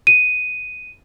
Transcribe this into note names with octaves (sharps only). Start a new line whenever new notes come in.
D#7